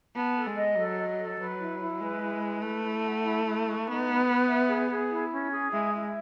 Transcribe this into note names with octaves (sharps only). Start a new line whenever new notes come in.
B3 A5
A4
G#3
D#5
F#3 A4
D#5
A4
F#3 B4
E4
E4
G#3 B4
E4
B4
A3 E4
E4
F#5
E4
E4
C#6
B3 D#4
B4
B4
E5
G#4
G#4
E4
C#4
G#4
G#3 E4
E4